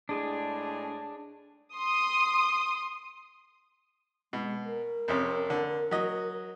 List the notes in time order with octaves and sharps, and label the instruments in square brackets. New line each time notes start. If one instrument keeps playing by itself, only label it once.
[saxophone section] A2 G#3 G#4 [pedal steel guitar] D4
[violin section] C6 D#6
[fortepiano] B2 [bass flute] G#3
[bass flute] A#4
[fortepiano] F2 C3 C#4
D3
F#3 D#5